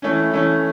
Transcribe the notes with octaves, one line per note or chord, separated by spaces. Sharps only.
E3 A3 C#4
E3 A3 C#4